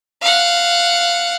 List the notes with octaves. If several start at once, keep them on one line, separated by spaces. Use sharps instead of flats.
F5 F#5